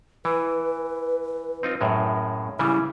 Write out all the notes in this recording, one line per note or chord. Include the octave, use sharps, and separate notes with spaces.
E3 B4
C4 D#4 F4
F#2 A2 G#3
C#3 E3 G3 E4